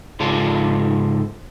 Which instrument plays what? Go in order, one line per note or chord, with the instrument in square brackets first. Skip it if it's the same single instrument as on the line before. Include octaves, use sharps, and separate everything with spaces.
[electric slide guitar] G#2 C#3 F4 A4 A5